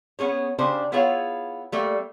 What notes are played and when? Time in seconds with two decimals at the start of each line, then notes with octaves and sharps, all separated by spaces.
0.19 B3 C#4 G#4 C#5
0.59 C#3 D4 G4 C5
0.92 B3 E4 F4 G#4 C#5 F5
1.72 G3 A3 A#3